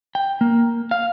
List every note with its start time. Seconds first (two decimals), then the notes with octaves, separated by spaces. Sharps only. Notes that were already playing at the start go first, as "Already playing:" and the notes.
0.15 G5
0.41 A#3
0.91 F5